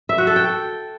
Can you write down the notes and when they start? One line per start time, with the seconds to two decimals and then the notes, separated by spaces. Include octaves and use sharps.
0.09 E5
0.18 F#4
0.27 A4
0.36 G5